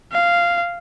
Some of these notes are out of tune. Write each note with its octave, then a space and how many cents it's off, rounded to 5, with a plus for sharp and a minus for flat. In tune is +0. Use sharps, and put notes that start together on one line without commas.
F5 -10